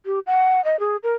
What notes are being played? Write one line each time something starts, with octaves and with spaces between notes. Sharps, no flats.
G4
F#5
D#5
G#4
A#4